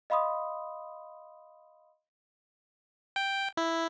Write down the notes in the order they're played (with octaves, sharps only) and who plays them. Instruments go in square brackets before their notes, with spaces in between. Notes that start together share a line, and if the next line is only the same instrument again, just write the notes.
[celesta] D#5 F5 B5 C6 D#6
[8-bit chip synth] G5
E4